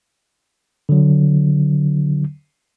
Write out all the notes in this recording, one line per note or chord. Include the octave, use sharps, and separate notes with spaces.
D3 F#3